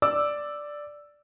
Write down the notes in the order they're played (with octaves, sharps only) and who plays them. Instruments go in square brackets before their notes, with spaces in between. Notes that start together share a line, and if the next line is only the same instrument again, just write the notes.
[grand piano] D5 D6 E6